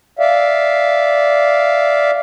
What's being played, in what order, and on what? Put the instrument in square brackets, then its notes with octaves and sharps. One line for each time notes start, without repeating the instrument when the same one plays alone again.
[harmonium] D5 E5 F5